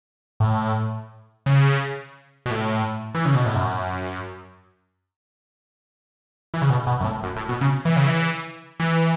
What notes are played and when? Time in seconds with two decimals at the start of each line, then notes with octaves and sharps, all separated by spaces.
0.40 A2
1.46 C#3
2.46 B2
2.51 A2
3.15 E3
3.25 C#3
3.35 B2
3.46 A2
3.55 F#2
6.54 E3
6.62 C#3
6.70 B2
6.87 B2
7.00 F#2
7.04 A2
7.23 F#2
7.36 A2
7.49 B2
7.61 C#3
7.85 E3
7.96 C#3
8.07 E3
8.80 E3